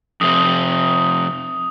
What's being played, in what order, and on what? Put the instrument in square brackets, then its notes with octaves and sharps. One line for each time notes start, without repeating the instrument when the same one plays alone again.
[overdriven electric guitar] F2 C3 [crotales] D#6